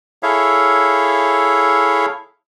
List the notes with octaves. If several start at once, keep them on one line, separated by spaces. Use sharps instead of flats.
E4 G#4 A4 C#5 E5 F5